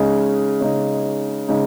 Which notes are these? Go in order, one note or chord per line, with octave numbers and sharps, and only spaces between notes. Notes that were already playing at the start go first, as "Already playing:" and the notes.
Already playing: C#3 G#3 D#4
C#3 G#3 D#4
C#3 G#3 D#4